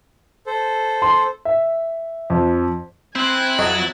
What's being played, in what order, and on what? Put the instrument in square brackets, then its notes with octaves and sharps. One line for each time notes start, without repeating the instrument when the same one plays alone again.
[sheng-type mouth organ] A4 C5
[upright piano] C6
[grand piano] E5
F2
[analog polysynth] C4 [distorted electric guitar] E4 [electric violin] G#5 F#6
[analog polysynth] F2 F#3 A6 [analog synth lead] D#5